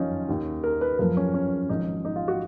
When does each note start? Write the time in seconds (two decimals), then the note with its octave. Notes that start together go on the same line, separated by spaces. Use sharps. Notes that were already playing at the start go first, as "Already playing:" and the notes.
Already playing: F#1 F2 D#3 C#4 D#4 F4
0.29 D#2 D#3
0.64 A#4
0.81 B4
0.99 F#1 F#2 F3 A#4
1.17 C#4
1.34 C#4
1.69 G#1 G#2 F3 D#4
2.05 D#4
2.16 F4
2.28 F#4